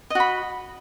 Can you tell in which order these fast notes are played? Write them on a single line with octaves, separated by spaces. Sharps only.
D#5 F#4 B5